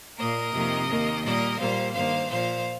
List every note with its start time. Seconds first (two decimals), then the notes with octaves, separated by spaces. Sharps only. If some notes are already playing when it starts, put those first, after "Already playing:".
0.17 A#2 A#3 A#4 D#5
0.53 F2 C3 D#3 A#3
0.88 D#2 D#3 A#3
1.23 A#2 G3 A#3 A#4 D#5
1.58 A#2 G3 A#3 C5 F5
1.93 G2 D#3 A#3 C5 F5
2.29 A#2 F3 A#3 C5 F5